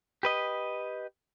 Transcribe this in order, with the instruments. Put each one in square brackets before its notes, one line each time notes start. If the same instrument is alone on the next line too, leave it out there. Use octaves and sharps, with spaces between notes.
[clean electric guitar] G4 B4 D#5